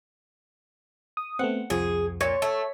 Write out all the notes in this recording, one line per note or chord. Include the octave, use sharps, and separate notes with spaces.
D#6
A3 B3 C4 F#5
C2 F2 F3 G#4
A#2 C#5
A3